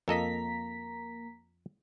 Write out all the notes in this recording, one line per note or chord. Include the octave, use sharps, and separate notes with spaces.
F2 A#3 A4 D#5 A#5 B6